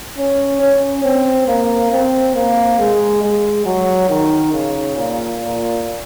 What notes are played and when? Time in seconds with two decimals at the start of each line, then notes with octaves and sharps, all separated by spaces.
0.18 C#4
0.62 C#4
1.04 C4
1.48 A#3
1.92 C4
2.35 A#3
2.80 G#3
3.23 G#3
3.66 F#3
4.09 D#3
4.53 C#3
4.97 A#2
5.41 A#2